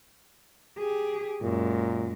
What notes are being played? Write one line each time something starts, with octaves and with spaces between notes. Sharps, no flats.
G4 G#4
F#2 A#2 G#3